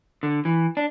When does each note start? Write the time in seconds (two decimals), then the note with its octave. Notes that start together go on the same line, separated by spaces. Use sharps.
0.23 D3
0.45 E3
0.77 D4